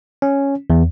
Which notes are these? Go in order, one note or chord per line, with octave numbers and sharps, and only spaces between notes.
C#4
E2